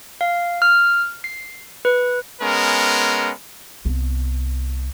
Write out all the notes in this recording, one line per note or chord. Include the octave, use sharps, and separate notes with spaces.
F5
F6
C7
B4
G#3 B3 C#4 A#4
C2 B3